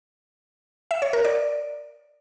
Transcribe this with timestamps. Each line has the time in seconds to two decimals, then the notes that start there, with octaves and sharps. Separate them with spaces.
0.91 E5
1.02 C#5
1.13 A#4
1.25 D5